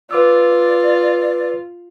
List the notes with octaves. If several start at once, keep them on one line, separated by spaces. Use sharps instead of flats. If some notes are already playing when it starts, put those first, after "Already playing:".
F4 B4 D5 D6 E6